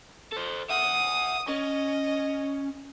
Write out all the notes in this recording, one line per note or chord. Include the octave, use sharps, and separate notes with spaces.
A4 C5
E5 F#5 D#6
C#4 D#5